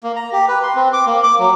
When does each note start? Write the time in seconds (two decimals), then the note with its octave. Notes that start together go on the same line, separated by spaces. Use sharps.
0.04 A#3
0.16 A#5
0.32 G4
0.48 B4
0.63 C6
0.75 C4
0.93 D6
1.06 A#3
1.24 D6
1.39 F#3